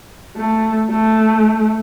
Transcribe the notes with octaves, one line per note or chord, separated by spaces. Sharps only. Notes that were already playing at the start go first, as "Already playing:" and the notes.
A3
A3